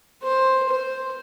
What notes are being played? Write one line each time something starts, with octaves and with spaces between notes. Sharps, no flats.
C5
C5